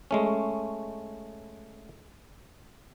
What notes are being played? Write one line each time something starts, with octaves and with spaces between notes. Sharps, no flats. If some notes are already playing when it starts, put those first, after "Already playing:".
G#3 A3 C#4